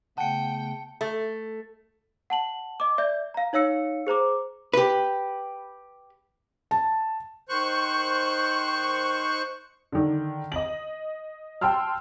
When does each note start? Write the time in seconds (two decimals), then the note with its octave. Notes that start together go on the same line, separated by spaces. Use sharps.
0.18 C#3 A3 B3 F#5 G5 A5 C#7
1.01 A3
2.30 F#5 A5 F#7
2.80 D#5 D6
2.98 D5 E5 G6
3.34 F5 A#5
3.53 D#4 C#5 F5 E6 C#7
4.07 G#4 C5 A#5 D6
4.74 G4 B4
6.71 A5
7.49 D#3 C5 C#6 F#6
9.92 D3 D#3
10.52 D#5 F#7
11.61 G5 A5 C6 E6 F6